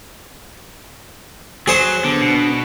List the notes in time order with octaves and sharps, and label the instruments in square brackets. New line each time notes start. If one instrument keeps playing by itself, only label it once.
[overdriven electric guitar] F#3 [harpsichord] G#4 C5
[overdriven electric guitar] D3 [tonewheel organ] B3 D4
[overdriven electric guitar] B2